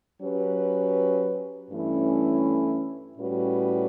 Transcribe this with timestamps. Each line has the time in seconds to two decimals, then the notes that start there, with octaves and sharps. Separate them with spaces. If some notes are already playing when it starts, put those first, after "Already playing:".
0.22 F#3 C#4 G4 B4
1.71 G2 E3 A3 C#4 E4
3.18 A2 G3 C#4 F#4 B4